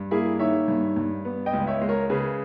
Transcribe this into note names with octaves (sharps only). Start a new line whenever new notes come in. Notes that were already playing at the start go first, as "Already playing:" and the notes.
Already playing: G2
A#3 E4 G#4
D#3 C#5 E5
G2
G2
B3
D#5 G5
C#2
C#5 E5
G#3
A#4 C#5
C#3 G#4 B4